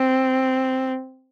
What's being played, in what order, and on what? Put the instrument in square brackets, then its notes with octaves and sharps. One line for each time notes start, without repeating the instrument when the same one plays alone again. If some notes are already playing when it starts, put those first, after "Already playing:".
Already playing: [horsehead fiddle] C4